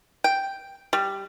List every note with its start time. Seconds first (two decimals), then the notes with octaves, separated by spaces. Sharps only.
0.24 G5
0.93 G3